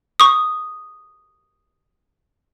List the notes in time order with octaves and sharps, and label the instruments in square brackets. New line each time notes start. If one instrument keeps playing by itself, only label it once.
[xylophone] C#6 D#6